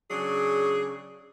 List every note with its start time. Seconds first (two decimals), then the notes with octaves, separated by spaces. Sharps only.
0.10 C#3 F#3 D4 G#4